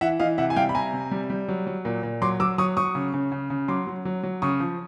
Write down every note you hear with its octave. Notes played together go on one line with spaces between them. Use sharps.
E3 E5 F#5
E3 D#5 F5
C3 E5 F#5
G#5
G3 F5 G5
B5
C3 G#5 A#5
C3
G3
G3
F#3
F#3
A#2
A#2
F#3 C6 D6
F#3 D6 E6
F#3 C#6 D#6
F#3 C#6 D#6
C#3
C#3
C#3
C#3
F#3 C6 D6
F#3
F#3
F#3
C#3 C#6 D#6
F3